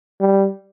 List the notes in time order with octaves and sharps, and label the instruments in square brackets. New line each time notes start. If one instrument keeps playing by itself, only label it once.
[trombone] G3